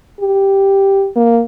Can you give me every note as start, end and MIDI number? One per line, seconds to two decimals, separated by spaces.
0.21 1.09 67
1.16 1.42 58